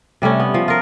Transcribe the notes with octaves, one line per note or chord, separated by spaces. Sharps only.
C3 G3 A3 C#4
B3
F3
F4 A#4